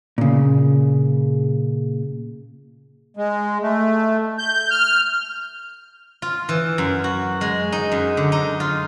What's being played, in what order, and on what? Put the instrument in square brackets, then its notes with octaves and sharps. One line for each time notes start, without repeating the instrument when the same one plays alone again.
[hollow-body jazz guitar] A#2 C#3
[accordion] G#3
A3
G6
F6
[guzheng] F4
E3
F#2
F#4
G#3
D#4
F#2
D3
D#4
F4